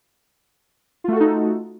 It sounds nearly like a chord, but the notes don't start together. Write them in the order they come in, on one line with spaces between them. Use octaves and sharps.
F4 A3 F#4 A4 D#4